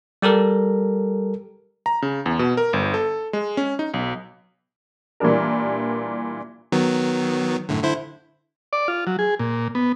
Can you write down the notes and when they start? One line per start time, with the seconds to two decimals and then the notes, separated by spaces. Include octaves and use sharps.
0.22 G3 G4 A4 A#4
1.86 A#5
2.02 C#3
2.26 E2
2.39 B2
2.57 A#4
2.73 G1
2.94 A4
3.33 G#3
3.57 C#4
3.79 D#4
3.94 B1
5.20 A#2 E3 G3 D4 A#4
6.72 D#3 F#3 B3
7.69 F#2 A2 D3
7.83 D3 E4 C5
8.73 D5
8.88 F4
9.07 F#3
9.19 G#4
9.39 A#2
9.75 B3